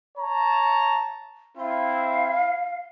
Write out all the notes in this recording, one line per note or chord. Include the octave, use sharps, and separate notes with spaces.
C#5 A5 A#5
C4 E4 F5